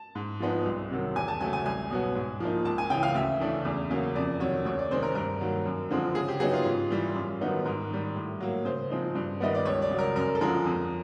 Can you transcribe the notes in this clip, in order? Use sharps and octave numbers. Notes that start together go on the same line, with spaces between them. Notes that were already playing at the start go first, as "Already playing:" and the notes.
Already playing: A5
G#2
F3 G#3 B3 D#4
C2
C3 D#3 F#3
E2 G#5
A5
C#3 F#3 A3 G#5
G#5
C2 G#5
B2 F#3 B3
G#2
F3 A#3 D#4
C#2 A5
G#5
C#3 E3 G5
F5
D2 E5
C#3 E3 A3 D4
E2
C#3 F#3 A#3 C#4
F2 D5
C3 D#3 F#3 C#5
D2 C#5
D5
C3 D#3 G#3 C5
A#4
G2 A#4
D#3 F#3 A#3
F#2
D3 F3 G#3 C4
C#3 G#4
G4
F#3 B3 D#4 G#4
F4
G#2
E3 G3
F#2
D#3 F#3 B3 D#4
G#2 A#4
D#3 G3
A2
F#3 A#3
C#3 C5
F3 G#3 C4 D#4
G2
D#3 G3 B3 D#5
D5
C#2 C#5
D5
C#3 F#3
A#4
F#2 A#4
A4
D3 F3 G#3 A#4
F2